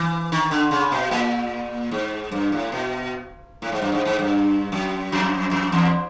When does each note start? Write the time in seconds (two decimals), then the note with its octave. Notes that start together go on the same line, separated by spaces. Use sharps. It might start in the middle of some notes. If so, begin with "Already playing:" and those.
Already playing: E3
0.32 D#3
0.51 D3
0.71 C#3
0.92 B2
1.11 A#2
1.91 G#2
2.32 G2
2.52 A2
2.72 B2
3.62 A2
3.72 G#2
3.82 G2
3.92 G#2
4.05 G#2
4.19 G2
4.72 F#2
5.12 F2
5.51 F2
5.72 E2